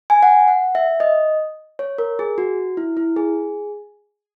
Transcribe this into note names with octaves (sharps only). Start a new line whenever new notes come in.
G#5
F#5
F#5
E5
D#5
C#5
A#4
G#4
F#4
E4
E4
G#4